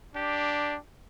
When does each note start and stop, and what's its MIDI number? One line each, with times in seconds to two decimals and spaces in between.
0.16 0.78 62
0.16 0.77 67